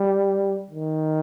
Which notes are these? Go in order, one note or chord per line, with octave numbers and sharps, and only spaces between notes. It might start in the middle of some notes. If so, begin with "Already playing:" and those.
Already playing: G3
D#3